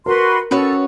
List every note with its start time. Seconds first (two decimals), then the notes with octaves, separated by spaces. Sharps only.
0.06 F#4 A#4 B4 C6
0.51 C#4 F#4 A4 B4 C#5